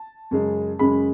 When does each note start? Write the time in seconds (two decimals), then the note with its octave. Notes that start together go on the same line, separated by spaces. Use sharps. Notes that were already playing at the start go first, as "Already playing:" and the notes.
Already playing: A5
0.31 F#2 C#3 G#3
0.79 F#2 C#3 G#3 B5